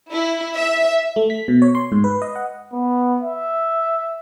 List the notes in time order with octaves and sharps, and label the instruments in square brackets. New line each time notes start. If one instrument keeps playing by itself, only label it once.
[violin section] E4
E5
[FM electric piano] A3
B6
B2
C#5
C6
G#2
B4
D#5
F#5
[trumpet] B3
E5